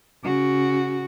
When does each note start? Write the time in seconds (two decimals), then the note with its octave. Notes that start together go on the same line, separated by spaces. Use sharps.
0.24 C#3 F#4